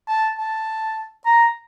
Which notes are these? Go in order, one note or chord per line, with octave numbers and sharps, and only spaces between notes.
A5
A5
A#5